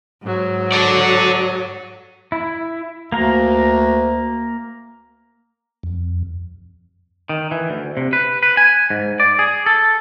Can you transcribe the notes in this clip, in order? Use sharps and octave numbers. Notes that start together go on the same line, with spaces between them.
G#2 F#3
A4 D5
E4
D2 A#3 A#4
F2
D#3
E3
D2
C3
B4
B4
G#5
G#2
D5
G#4
A4